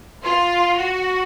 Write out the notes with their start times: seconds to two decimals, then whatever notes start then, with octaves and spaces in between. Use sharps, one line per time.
0.23 F4
0.78 F#4